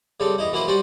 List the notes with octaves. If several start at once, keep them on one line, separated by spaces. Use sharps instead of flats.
C#3 G3 C4 A4
E2 D#4 E4
E3 F#3 A#3 E4 B4 C5
G3 C#4 F#4 C5 D5